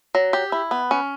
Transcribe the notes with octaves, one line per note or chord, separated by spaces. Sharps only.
F#3
G4
E4
B3
C#4